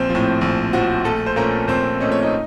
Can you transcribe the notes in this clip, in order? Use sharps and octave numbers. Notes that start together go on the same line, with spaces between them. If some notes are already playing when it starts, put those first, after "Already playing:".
Already playing: A#1 C4 C5
F3
A2
A#1
A2 F3 F#4
A#1 A3 A4
C5
A#2 A3 A#3 C#4 A#4
A#1 C4 C5
A#2 A3 C#4 D#5
C#5
D#4 D#5